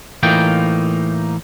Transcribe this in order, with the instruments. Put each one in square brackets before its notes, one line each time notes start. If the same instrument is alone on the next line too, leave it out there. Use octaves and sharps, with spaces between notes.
[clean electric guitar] A2 E3 A#3 D#4 F4 G5